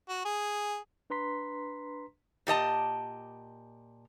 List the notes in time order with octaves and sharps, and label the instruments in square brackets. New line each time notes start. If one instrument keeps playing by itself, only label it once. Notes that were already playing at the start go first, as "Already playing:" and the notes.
[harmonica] F#4
G#4
[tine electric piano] D4 B4 A#5 C6 B6
[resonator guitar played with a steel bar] A#2 G4 D#5 A5